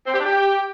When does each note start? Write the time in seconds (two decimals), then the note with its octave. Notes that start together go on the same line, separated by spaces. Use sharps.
0.06 C4
0.13 G4
0.19 D4
0.26 G4